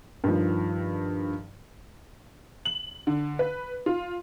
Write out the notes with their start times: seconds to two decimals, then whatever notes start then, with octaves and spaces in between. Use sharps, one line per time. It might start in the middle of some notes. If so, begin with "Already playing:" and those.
0.24 G2 D#3 F3
2.65 F#7
3.07 D3
3.39 B4
3.86 F4